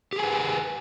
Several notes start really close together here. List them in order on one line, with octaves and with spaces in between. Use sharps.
G4 G#4 G#5 B4